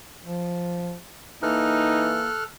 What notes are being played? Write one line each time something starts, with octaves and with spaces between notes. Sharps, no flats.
F3
E3 A#3 D#4 A4 F6 F#6